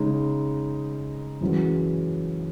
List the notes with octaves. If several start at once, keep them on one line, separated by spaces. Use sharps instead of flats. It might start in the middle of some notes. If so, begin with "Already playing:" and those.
Already playing: C#3 G#3 D#4
F#2 E3 G#3 C#4 F#4